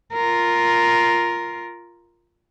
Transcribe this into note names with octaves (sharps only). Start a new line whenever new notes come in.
F4 A#4